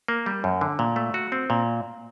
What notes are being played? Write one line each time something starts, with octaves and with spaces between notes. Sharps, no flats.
A#3
G3
F#2
D3
A#2
A3
F#4
C4
A#2